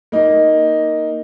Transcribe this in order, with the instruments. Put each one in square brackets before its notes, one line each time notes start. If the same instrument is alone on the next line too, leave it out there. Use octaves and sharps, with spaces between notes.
[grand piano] A#3 D#4